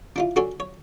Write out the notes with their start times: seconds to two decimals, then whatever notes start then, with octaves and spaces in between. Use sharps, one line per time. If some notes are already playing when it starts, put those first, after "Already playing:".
0.16 D4 E4 F4
0.36 D4 F#4 A4 C#5 G#5
0.60 C#5